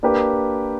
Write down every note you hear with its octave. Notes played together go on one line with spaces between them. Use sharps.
A#3 D4 G4 B4